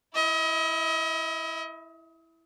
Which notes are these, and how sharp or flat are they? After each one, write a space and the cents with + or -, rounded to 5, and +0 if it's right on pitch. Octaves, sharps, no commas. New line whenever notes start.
E4 +0 D#5 +35